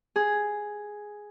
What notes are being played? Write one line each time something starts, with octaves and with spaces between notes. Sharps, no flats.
G#4